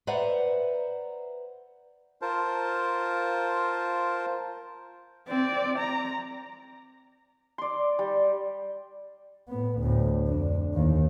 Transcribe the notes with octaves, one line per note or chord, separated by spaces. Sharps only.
B4 C5 D5 E5 F#5 A#5
F4 A#4 C5 A5
C4 D5
A#5
D5 C6
G3
A2 B3
D2 A2
F2 D4
D#2 D#3